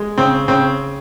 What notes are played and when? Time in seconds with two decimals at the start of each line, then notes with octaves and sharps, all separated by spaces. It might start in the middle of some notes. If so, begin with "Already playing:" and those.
Already playing: G#3
0.18 C#3 C4
0.48 C#3 C4